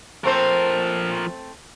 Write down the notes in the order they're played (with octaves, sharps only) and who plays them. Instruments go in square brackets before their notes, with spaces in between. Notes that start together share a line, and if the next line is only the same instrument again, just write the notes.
[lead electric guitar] F3 A#4 [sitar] A3 C4 C5